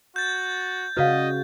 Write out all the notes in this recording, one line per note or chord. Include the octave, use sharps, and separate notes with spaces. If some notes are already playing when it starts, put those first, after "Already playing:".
F#4 G6 A6
C#3 F#4 B4 D5 D#5 F5